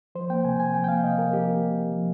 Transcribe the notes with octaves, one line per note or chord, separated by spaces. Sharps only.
F3 C5
A#3 G5
C3 G#5
C3 G#5
F3 G5
G5
A#3 F5
C3 D#5
C3 A#4
F3 G4
A#3
C3
C3
F3